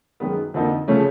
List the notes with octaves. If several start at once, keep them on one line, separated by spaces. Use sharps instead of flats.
F#2 D#3 G#3 B3
F2 D3 F3 A#3 D#4
C#3 F3 A3 C#4